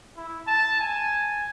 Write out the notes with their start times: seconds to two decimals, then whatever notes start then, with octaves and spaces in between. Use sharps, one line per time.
0.17 E4
0.47 A5
0.80 G#5